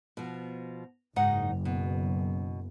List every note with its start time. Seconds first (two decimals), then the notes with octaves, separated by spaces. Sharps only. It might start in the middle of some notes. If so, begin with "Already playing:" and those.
0.17 B2 F3
1.16 F#1 G#2 D#4 F#5
1.65 B2